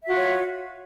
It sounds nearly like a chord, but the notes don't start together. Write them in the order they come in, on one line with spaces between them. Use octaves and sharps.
E5 F#4 F4 C#5